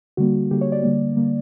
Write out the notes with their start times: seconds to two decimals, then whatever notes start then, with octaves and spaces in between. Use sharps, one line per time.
0.17 D3 G3 A#3 F#4
0.51 D3 G3 A#3 G4
0.61 C#5
0.72 D5
0.83 D3 G3 A#3
1.16 D3 G3 A#3